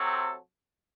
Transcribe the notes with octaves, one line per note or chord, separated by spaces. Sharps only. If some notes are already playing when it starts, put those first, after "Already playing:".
Already playing: C3 F#3 A3 C4 A4